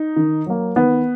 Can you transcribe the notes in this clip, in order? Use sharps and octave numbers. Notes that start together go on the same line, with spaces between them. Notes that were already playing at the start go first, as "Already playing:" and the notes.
Already playing: D#4
D#3
F#3 A#3
D#3 B3